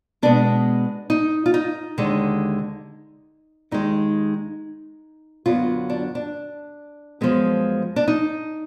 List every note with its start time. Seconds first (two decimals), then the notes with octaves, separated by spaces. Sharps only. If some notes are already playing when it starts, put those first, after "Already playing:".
0.22 B2 G#3 B3 D4
1.10 D#4
1.46 F4
1.54 D#4
1.98 D#2 D3 G#3
3.71 D#2 D#3 G#3 D#4
5.46 F#2 D3 F#3 B3 F4
5.90 D4
6.15 D4
7.21 F#2 F3 G#3 B3
7.96 D4
8.08 D#4